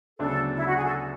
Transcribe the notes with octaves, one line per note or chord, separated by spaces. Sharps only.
D2 C#3 F#3 B3 D4 A4
E4
F#4
G#4
A4